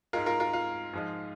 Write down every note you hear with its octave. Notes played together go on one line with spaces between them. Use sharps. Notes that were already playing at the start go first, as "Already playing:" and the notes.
G#2 G#3 F4 A#4
F4 A#4
F4 A#4
F4
G#2 F3 G#3